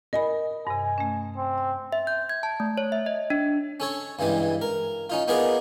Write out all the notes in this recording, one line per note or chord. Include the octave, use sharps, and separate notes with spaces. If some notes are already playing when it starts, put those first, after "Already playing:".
A#4 D#5 G#5 B5
G2 C3 G#5
A3 C#4
C4
E5
G6
G#6
A5
A3
C#5
E5
D#5
D4
C#4 A4 C#5
G2 C#3 E3 G3 G#3
A#4
C#4 D#4 F4
B3 D#4 F4 G#4 A#4 D5